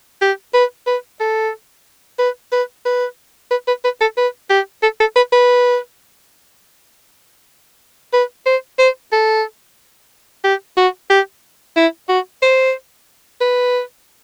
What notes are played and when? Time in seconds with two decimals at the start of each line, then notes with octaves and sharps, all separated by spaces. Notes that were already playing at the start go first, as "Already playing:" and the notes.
0.22 G4
0.54 B4
0.87 B4
1.20 A4
2.19 B4
2.52 B4
2.85 B4
3.51 B4
3.68 B4
3.84 B4
4.01 A4
4.17 B4
4.50 G4
4.83 A4
5.00 A4
5.16 B4
5.33 B4
8.13 B4
8.46 C5
8.79 C5
9.12 A4
10.44 G4
10.77 F#4
11.10 G4
11.76 E4
12.09 F#4
12.42 C5
13.41 B4